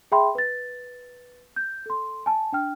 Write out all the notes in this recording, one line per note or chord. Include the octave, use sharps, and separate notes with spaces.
G#4 E5 G5 B5 C6
B4 A6
G6
A4 C6
G#5 A5
D4 G5 F6